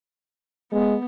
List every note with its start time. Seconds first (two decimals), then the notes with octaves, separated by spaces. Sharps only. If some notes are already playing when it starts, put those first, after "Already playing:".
0.72 G#3 B3